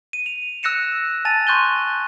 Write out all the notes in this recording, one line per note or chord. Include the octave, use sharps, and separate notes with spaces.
D#7
F7
E6 F#6 A#6 C#7 E7
G#5 A5 A6 D#7 F7
C6 C#6 F#6 G6 D#7 G7